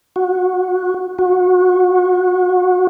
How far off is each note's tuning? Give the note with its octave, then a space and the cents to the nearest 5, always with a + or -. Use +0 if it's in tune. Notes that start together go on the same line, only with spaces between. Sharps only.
F#4 -15
F#4 -25